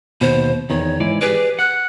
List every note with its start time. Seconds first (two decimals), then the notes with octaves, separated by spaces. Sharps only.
0.21 D#2 B2 C5
0.70 E2 D#3 C#5
1.00 G#2 E3 D5
1.21 G4 G#4 B4 D5
1.59 F#5 F#6